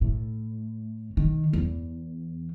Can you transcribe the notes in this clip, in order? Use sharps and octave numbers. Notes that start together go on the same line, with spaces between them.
A2
D#3
E2